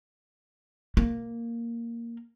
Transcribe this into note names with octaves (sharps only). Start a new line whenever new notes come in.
A#3